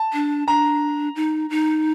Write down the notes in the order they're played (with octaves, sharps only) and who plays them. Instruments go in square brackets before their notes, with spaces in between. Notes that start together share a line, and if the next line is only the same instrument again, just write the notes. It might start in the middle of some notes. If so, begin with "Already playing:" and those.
Already playing: [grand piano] A5
[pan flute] D4
[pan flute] D4 [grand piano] A#5
[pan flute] D#4
D#4